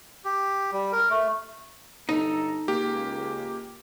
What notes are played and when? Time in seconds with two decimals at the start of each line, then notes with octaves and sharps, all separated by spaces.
0.25 G4
0.72 G3
0.92 A#4
1.10 A3
2.09 G1 D#4 A4 A#5
2.68 C#2 A#3 G4